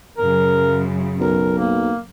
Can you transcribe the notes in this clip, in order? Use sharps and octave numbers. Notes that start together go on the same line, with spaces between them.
F#2 C#3 A#4
B1 A#4
A#3